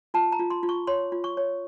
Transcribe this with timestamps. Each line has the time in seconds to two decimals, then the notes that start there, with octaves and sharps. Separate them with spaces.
0.14 F4 A5
0.32 A#5
0.39 F4
0.50 C6
0.63 F4
0.69 C#6
0.87 C#5 C6
1.12 F4
1.24 C#6
1.37 C#5